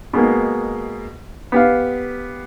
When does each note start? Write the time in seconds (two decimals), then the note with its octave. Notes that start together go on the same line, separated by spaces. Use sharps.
0.13 B2 G#3 A#3
1.52 B3 G4 F5